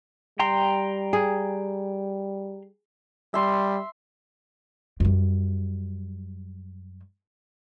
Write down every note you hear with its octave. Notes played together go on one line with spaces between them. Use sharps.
G3 G5 A#5 C6
G#4
G3 E5 C6
F#2 G3